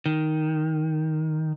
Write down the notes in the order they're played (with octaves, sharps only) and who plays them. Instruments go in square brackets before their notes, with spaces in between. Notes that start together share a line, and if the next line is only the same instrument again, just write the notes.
[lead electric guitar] D#3